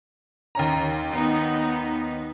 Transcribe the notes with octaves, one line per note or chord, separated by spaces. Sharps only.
D#2 C#4 A#5
B3 D#4